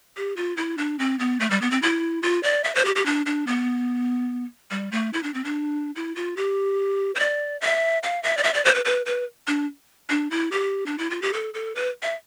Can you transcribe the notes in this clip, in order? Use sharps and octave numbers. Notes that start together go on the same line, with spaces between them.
G4
F4
E4
D4
C4
B3
A3
G3
B3
C4
E4
F4
D5
E5
C5
G4
G4
D4
D4
B3
G3
A3
E4
D4
C4
D4
E4
F4
G4
C5
D5
E5
F5
E5
D5
E5
D5
C5
B4
B4
B4
D4
D4
E4
G4
D4
E4
F4
G4
A4
A4
B4
E5